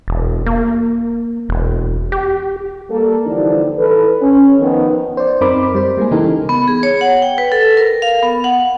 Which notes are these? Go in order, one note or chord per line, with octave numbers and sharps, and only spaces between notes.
E1
A#3
E1
G4
G3 A#3 A4
D3 E3 F3 G3 D4 D#4
E3 A4 B4
C#4
D#3 F3 B3
C5 D5
F#2 C4 D#4 A#4 B5 D6
G3 C5
G3 G#3 A#3 G#4
C#3 E3 D#4 G4 A4 A#4
B3
G#4
C#5
F#5
G5
B4
A4
A#4
F5
B3
F#5